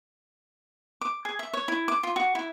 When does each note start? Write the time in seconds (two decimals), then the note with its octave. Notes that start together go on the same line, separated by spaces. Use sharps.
1.01 D6
1.25 G#4
1.39 E5
1.54 C#5
1.68 E4
1.88 D6
2.03 F4
2.16 F#4
2.35 E4